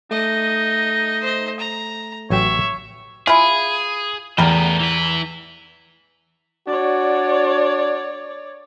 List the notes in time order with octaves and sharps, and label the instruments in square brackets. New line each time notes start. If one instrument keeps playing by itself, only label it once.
[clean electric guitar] A3 [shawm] D#4 [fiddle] D#5
[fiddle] C5 D#5
A#5
[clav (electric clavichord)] A1 F#3 G5 [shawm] C#5 [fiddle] E5
[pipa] E4 F4 [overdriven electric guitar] G#4 [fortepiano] G#5
[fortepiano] E2 [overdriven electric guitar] A2 B3 [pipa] G3 A#4
[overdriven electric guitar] E3 B4
[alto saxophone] D4 [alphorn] F#4 [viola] C#5 D5